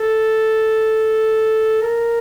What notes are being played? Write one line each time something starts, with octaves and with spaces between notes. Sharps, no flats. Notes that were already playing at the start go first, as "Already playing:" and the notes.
Already playing: A4
A#4